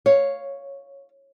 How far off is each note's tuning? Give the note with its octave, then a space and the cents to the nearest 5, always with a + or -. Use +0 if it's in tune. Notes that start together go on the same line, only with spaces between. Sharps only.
C#5 +0 F5 +0